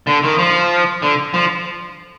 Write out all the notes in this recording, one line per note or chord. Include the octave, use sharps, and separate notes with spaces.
D3
D#3
F3
D3
F3